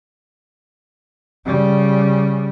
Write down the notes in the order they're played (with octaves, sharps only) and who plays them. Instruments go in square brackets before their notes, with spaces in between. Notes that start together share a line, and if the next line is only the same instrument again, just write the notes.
[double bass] C#3 G3